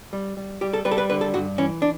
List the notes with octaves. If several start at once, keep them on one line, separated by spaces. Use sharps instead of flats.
G3
G3
G3 G4
A4
G3 B4
A4
B4
D3 B4
A4
G2 F#4
E3 C#4
D4